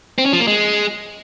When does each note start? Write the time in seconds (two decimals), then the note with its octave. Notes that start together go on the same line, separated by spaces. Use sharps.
0.18 C4
0.26 C#4
0.33 F3
0.40 A#3
0.47 G#3